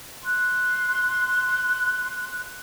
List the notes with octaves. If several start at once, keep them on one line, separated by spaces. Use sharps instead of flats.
C6 F#6